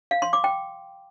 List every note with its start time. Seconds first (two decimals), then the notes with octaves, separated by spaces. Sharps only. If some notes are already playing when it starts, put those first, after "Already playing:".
0.11 F5
0.22 C6
0.33 D6
0.44 G5